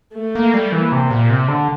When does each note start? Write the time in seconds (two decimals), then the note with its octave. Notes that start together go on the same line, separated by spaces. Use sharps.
0.15 A3
0.35 A#3
0.54 G3
0.72 E3 A#3
0.92 C3
1.11 A#2
1.30 C3
1.48 D3